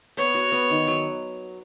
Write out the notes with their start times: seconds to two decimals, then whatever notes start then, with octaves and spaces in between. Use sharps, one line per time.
0.17 B3 C#5
0.35 F#4
0.52 B3
0.70 D#3
0.87 F#3